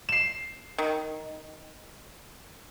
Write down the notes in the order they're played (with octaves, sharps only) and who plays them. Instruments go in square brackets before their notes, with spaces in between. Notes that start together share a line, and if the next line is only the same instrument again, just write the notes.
[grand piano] C7 E7
[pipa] D#3